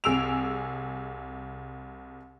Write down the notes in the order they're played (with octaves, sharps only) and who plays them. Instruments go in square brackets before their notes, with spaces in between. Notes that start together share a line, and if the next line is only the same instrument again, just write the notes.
[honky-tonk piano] C2 G#4 E6 D7 F7